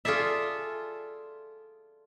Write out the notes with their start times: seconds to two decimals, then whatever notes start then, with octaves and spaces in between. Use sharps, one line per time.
0.05 F4 G#4 A4 D5 E5